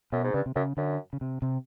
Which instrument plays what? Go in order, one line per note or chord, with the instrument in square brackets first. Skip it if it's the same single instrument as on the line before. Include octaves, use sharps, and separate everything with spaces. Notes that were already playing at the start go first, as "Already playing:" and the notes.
[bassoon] F#2 [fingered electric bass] B2
[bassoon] G#2
[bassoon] G2 [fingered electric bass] C#3
[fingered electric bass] C3
[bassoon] F#2 [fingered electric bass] C#3
[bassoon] F#2 [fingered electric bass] D3
[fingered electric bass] C#3
C3
C3